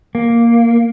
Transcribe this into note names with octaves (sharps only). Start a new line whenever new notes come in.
A#3